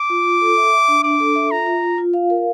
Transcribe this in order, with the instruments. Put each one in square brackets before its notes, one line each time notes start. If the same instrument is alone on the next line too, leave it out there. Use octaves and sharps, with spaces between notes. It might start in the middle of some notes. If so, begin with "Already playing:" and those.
Already playing: [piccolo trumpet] D6
[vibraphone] F4
F4
A4
E5
E5
D4
[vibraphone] D4 [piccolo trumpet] D6
[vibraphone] A4
E5
[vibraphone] F4 [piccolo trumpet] A#5
[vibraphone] F4
F4
F4
F5
A#4